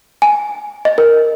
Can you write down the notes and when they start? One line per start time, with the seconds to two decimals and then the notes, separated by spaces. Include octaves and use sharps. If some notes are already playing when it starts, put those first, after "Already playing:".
0.22 G#5
0.85 D#5
0.98 A#4